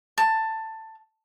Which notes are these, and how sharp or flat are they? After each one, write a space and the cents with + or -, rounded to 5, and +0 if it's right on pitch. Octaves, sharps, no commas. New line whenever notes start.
A5 +15